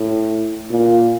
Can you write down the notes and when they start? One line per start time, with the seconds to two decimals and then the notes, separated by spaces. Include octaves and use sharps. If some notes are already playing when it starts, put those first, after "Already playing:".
Already playing: A2
0.70 A#2